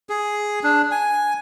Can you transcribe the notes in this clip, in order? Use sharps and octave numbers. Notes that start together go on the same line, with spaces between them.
G#4
D4
G#5